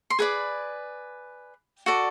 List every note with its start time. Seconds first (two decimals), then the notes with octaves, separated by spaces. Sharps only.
0.10 C6
0.19 G#4 B4 D5 B5
1.86 F#4 A4 D5